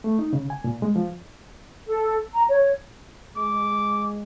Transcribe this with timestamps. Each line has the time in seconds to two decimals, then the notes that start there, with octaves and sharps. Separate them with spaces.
0.04 A3
0.19 D#4
0.33 C#3
0.50 G#5
0.64 A#2
0.82 G#3
0.96 F3
1.88 A4
2.34 A#5
2.49 C#5
3.36 G#3 D6